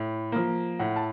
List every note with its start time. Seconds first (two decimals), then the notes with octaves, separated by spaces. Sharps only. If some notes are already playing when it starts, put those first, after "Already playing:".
Already playing: A2
0.32 F3 A#3
0.79 A2 F#5
0.96 A5